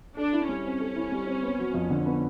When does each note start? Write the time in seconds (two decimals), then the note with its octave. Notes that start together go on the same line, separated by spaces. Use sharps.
0.17 D4 A4
0.33 E4
0.48 G3 C#4
0.65 C4
0.80 A4
0.96 E4
1.12 G3
1.27 C4
1.43 B3
1.59 F#3
1.74 F2
1.90 D3
2.06 B3